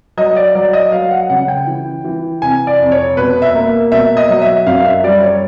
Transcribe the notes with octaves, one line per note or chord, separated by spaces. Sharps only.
F#3 D#5
D5
F#3 D5
D#5
F#3 F5
F#5
C#3 F#5
G5
E3
E3
C3 G#5
D5
F2
C#5
B2 B4
E5
A#3
B2 E5
D#5
F#3
E5
F#2 F5
E5
G3 D5
C#5